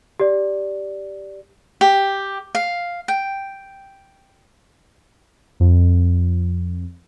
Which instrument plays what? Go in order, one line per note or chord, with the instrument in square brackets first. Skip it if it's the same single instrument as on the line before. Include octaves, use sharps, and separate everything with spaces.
[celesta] G4 D5
[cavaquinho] G4
F5
G5
[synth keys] F2